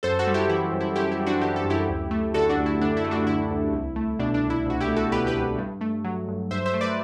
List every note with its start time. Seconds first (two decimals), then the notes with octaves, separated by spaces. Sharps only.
0.03 F#2 A4 C5
0.19 F#4 A4
0.27 G3
0.34 E4 G4
0.49 E3 E4
0.72 F#2
0.80 E4
0.96 F#2 E4 G4
1.11 E4
1.20 G3
1.27 D4 F#4
1.41 E3 G4
1.56 A4
1.65 F#2
1.70 E4 G4
1.89 D2
2.11 A3
2.34 D3 F#4 A4
2.49 D4 F#4
2.58 D2
2.66 E4
2.81 D2 D4
2.97 E4
3.04 A3
3.11 D4 F#4
3.27 D3 E4
3.50 D2
3.73 C2
3.96 A3
4.19 B2 D4
4.34 D4
4.43 C2
4.50 E4
4.66 C2 F#4
4.80 E4 G4
4.88 A3
4.96 F#4 A4
5.12 B2 G4 B4
5.27 G4 B4
5.34 C2
5.59 G2
5.81 A3
6.04 F#3
6.28 G2
6.51 G2 C5 E5
6.66 C5 E5
6.74 A3
6.81 B4 D5